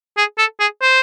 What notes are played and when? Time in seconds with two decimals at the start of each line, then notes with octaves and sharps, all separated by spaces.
0.17 G#4
0.38 A4
0.60 G#4
0.82 C5